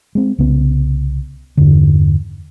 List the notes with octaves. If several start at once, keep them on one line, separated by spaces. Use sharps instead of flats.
G#3 C4
C2 C#3 B3
E2 G2 D3